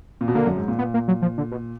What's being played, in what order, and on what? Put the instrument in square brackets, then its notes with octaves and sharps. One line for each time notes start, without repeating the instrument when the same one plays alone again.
[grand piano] A#2
B2
[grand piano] D3 [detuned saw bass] A#3
[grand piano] F#2
G#2
A#2
[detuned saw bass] B3
A#3
F#3
F3
D3
B2